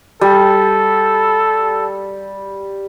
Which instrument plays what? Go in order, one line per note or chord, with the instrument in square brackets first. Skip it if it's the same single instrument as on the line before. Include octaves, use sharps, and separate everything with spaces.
[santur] G3 [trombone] A4